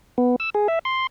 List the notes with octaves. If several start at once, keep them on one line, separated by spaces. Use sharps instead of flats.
B3
E6
G#4
E5
C6